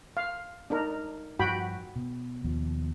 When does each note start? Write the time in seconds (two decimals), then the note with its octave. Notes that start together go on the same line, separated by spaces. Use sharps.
0.17 F5
0.70 D4 D#4 A#4
1.39 G2 F3 F#4 G5 B5
1.96 B2
2.44 D#2 B2 F3